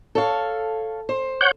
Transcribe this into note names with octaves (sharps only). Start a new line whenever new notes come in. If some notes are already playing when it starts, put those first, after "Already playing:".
A4 C#5 F5
C5
C#5 F#5 G6